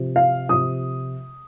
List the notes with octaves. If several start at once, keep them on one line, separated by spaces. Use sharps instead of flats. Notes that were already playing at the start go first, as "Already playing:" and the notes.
Already playing: C3 F3
F5
C3 F3 D#6